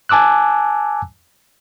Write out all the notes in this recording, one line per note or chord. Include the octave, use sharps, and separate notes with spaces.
G#5 A5 D6 E6 F#6